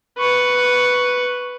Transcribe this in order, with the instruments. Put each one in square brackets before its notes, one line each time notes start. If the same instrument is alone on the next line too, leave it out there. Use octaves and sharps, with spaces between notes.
[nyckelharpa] B4 C#6